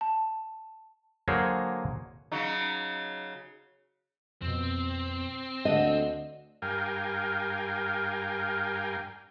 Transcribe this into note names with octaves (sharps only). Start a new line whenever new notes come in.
A5
D3 F#3 A#3 G#4 C5 C#5
C#3 F#3 D#4
F2 B2 C4
D2 D4 A4 D#5 F#5
G2 A#4 F5 G5 G#5